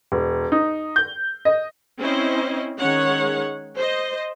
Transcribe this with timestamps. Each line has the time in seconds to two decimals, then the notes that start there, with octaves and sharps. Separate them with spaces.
0.12 E1
0.52 D#4
0.96 G6
1.45 D#5
1.99 C4 C#4 E4 C5 D#5
2.78 D#3 G#3 C#4 C#5 F#5
3.77 C5 D#5